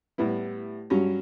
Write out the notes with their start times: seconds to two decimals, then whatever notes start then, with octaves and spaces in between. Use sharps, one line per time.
0.18 A2 G3 B3 E4
0.90 G2 F#3 C#4